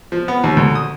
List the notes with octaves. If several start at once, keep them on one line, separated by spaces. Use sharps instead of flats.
F3
B3
D#2
D2
D#6